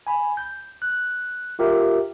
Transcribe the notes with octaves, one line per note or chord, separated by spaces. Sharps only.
G#5 B5
G6
F#6
F4 G4 A#4 E5